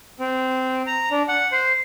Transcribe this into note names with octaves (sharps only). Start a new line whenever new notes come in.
C4
A#5
D4
F#5
C5